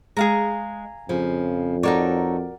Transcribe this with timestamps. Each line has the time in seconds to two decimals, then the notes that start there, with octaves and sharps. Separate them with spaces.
0.17 G#3 G#4 F5 A#5
1.09 F2 C#3 F3
1.83 D#4 F#4 A4 A#4 C#5 D5